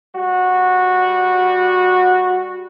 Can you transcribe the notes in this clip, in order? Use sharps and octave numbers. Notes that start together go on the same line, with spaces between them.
G3 F#4